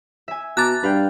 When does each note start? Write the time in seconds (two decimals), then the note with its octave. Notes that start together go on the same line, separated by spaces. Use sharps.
0.28 E5 G#5
0.57 B2 A5 A#5 D6 F#6 A6
0.83 G2 B4 F5 G5